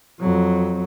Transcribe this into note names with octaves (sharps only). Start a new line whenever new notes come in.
F2 F#3